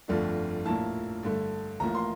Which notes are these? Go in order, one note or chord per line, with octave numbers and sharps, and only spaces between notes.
G1 F2 D3 A3 D4
A#1 A2 F3 A#3 E4 A5
G2 D3 A3
A1 A2 F3 A#3 A#5
C6